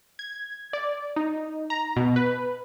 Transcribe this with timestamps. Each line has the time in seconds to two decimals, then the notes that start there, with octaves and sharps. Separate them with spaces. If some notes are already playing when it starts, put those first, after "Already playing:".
0.19 G#6
0.73 D5
1.16 D#4
1.70 A#5
1.96 B2
2.16 B4